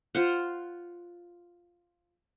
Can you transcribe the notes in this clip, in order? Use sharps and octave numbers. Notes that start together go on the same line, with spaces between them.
F4 C5 F#5